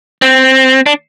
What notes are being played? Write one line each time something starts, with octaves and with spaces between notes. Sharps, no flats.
C4
D4